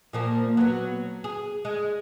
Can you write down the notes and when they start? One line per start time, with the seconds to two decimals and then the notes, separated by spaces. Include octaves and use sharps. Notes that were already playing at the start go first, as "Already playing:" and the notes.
0.13 A#2 F3 A#3
0.57 F#3 B3
1.24 G#4
1.65 G#3